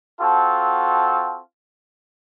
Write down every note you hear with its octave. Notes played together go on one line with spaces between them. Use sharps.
C4 F4 F#4 A4 A5